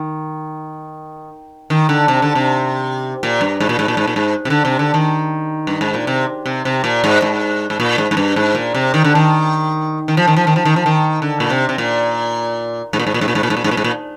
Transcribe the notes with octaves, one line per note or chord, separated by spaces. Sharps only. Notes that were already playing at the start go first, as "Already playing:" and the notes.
Already playing: D#3
D#3
D3
C3
D3
C3
A#2
G2
G#2
A#2
G#2
A#2
G#2
A#2
G#2
C3
D3
C3
D3
D#3
G2
G#2
A#2
C3
C3
C3
A#2
G#2
G#2
G#2
A#2
G#2
G#2
G2
G#2
A#2
C3
D#3
D3
D#3
D#3
F3
D#3
F3
D#3
F3
D#3
F3
D#3
D3
A#2
C3
C3
A#2
G#2
A#2
G#2
A#2
G#2
A#2
G#2
A#2
G#2
A#2
G#2
A#2
G#2
A#2